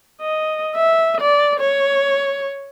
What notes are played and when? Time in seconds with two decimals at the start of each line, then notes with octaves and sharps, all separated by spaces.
0.21 D#5
0.76 E5
1.21 D5
1.60 C#5